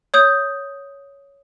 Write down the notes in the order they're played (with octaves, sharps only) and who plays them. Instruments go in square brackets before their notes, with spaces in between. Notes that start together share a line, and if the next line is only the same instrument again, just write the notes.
[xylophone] C#5 D#6 G6